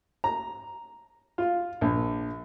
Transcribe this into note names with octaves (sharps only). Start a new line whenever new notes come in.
A#5
F4
A#1